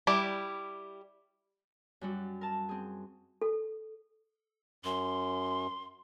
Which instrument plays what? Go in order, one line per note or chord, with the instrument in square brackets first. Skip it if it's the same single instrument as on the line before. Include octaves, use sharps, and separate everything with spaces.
[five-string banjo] G3 E4 G4
[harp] F#2 G3 F#4
A#4 A5
C4 G#4
[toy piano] A4
[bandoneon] F#2 [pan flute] C6